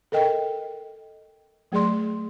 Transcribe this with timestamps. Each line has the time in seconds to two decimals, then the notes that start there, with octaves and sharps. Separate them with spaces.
0.12 A4 A#4 D#5 G5
1.72 F#3 A3 G#4 D5 C6